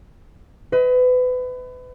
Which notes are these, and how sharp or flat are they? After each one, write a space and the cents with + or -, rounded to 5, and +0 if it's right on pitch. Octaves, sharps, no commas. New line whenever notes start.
B4 +30 D#5 +35